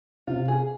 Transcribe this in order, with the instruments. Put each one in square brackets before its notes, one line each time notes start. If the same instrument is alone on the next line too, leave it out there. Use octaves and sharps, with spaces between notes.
[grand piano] C3 [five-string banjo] F4
[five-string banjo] G#4